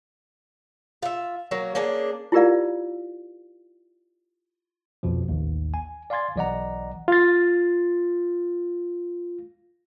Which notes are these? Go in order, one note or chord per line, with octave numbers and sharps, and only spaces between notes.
F4 E5
F#3 A#3 F#4
A#3 C#4 D4 G#4
E4 F4 G4 A#4 D5 F5
A#1 F2 B2 F3
A1 D#2
G#5
D5 F5 G#5 C6 G#6 A6
B1 E3 D5 D#5 F#5 A#5
F4 A6